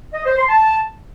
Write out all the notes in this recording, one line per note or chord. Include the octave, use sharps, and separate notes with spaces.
D#5
C5
C6
A5